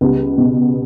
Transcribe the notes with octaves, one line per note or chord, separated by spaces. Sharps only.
C#2 G3 B3
B2